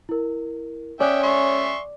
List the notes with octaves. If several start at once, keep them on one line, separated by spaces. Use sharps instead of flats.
E4 A#4
C#4 D5 E5 G5 G#5 D#6 F#6
E5 C6 C#6